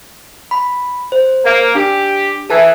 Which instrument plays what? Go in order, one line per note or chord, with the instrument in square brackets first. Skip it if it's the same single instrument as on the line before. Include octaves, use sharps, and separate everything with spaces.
[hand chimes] B5
C5
[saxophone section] A#3
[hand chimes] D4 [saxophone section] G4
[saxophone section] E3 [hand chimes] A4 A5 G#6